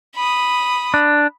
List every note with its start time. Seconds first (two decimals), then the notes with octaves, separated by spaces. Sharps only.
0.15 B5 D#6
0.94 D4